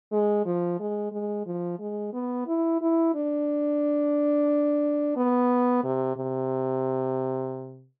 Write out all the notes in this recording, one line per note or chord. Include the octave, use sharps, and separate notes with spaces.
G#3
F3
G#3
G#3
F3
G#3
B3
E4
E4
D4
B3
C3
C3